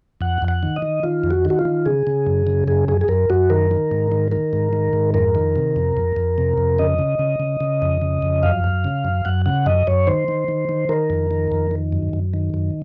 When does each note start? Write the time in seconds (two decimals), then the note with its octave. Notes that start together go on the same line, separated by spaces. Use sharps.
0.21 F2 F#5
0.42 F2
0.48 F#5
0.63 D#3
0.76 D#5
0.82 D#3
1.03 D#3 F4
1.24 F2
1.31 F#4
1.45 D#3
1.50 F#4
1.59 F4
1.65 D#3
1.86 C#3 G#4
2.07 C#3
2.26 F#2
2.47 C#3
2.68 F#2 G#4
2.88 F#2 G#4
3.01 G#4
3.08 F#2 A#4
3.30 F#2 F#4
3.50 D#3 A#4
3.71 D#3
3.91 G#2
4.12 D#3
4.32 D#3 A#4
4.53 G#2
4.73 D#3
4.93 G#2
5.14 F2 A#4
5.35 D#3
5.56 C3
5.76 F2
5.97 F2
6.16 F2
6.38 C3
6.58 F2
6.79 C#3 D#5
6.99 C#3
7.19 C#3
7.40 C#3
7.61 C#3
7.82 F2
8.01 C#3
8.22 F2
8.43 F#2 F5
8.64 F#2
8.84 C#3
9.05 F#2
9.25 F#2 F#5
9.46 C#3 F#5
9.66 F#2 D#5
9.87 F#2 C#5
10.07 D#3 C5
10.28 D#3
10.48 D#3
10.69 D#3
10.89 D#3 A#4
11.10 F2
11.31 D#3
11.52 F2
11.71 D#3
11.92 F#2
12.13 F#2
12.34 D#3
12.54 F#2